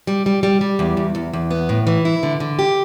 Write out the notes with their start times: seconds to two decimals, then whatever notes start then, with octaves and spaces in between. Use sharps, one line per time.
0.07 G3
0.26 G3
0.43 G3
0.61 G3
0.79 E2
0.97 E2
1.15 E2
1.33 E2
1.51 B3
1.69 A2
1.87 E3
2.05 E4
2.23 D3
2.40 D3
2.59 G4